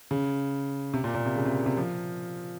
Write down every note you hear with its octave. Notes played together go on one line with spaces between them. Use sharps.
C#3
C3
A#2
A#2
C3
C#3
C3
C3
F3